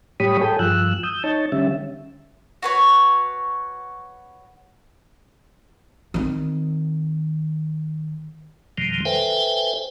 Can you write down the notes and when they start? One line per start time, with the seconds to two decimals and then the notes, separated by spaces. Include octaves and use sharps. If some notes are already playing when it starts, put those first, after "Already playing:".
0.20 A2 G3 G4 C#5 B5 D#6
0.41 G#4 A4 G5
0.59 G2 F3 E6 F#6
1.03 D#6 E6 G6
1.24 D#4 C#5 A5
1.52 D3 G3 C#4 E5
2.63 F#4 B4 C#5
6.14 D#3 C4
8.78 F2 B2 D#3 F3 G3
9.05 A4 B4 C5 E5 G5 G#5